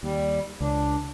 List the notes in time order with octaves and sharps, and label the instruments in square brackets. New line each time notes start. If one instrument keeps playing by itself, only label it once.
[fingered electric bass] D#2 [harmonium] G3
[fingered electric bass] C#2 [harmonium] D4